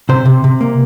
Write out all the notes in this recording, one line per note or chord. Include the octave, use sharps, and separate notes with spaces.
C3 C5
C3
C3
A#3